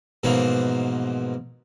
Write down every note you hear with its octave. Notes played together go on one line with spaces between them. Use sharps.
G#2 B2 E3 F3 A#3